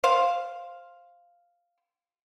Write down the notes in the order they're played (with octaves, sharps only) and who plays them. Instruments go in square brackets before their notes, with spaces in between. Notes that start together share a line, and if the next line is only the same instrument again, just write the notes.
[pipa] C5 F5